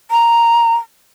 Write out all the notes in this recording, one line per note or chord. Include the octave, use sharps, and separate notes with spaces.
A#5